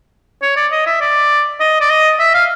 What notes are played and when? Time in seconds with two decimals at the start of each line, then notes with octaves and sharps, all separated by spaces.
0.42 C#5
0.56 D5
0.71 D#5
0.86 E5
1.01 D5
1.60 D#5
1.81 D5
1.90 D#5
2.19 E5
2.34 F5